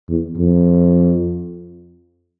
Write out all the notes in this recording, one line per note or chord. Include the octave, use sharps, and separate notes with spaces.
E2
F2